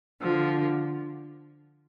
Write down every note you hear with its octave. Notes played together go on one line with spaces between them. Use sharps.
D3 F3